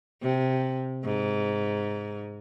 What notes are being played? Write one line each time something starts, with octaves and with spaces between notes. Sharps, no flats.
C3
G#2